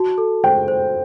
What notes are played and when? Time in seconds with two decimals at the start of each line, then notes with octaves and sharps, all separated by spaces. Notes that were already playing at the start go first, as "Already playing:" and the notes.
Already playing: F#4 A5
0.18 A4
0.44 C5 G5
0.68 C5